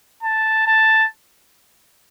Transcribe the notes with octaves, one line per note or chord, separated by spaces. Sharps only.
A5
A5